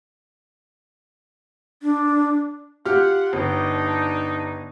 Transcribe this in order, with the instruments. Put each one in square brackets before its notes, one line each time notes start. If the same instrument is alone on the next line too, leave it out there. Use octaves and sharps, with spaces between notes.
[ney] D4
[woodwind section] F4 F#5 [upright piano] G4 F6
[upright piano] G1 [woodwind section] D4 D#4